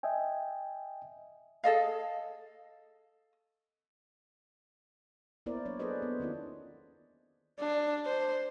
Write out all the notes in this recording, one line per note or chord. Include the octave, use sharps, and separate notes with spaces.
D#5 E5 G5 G#5
G#4 A4 D#5 F5
A#3 B3 E4 A#4 C5 D5
F#3 D4 C#5
G#4 A4 B4 C5 D5 D#5
B3
D#3 C#4 D#4 F4
D4
C5